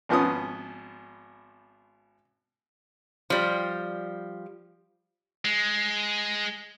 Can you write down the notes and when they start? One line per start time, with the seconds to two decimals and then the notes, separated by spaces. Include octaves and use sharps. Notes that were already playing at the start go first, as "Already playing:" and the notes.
0.09 G#1 F3 B3 C#4 D#6
3.30 F3 G3
5.45 G#3